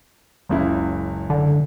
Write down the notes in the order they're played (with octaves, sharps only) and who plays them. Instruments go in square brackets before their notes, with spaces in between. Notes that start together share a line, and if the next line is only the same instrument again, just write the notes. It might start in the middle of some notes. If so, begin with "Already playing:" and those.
[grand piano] F#1 C#2 E4
[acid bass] D3